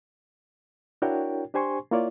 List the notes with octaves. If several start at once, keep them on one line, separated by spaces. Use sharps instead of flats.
D4 E4 F#4 A#4 C#5 G5
D4 G4 C5 G#5 C6 C#6
A#3 E4 F4 C#5 D5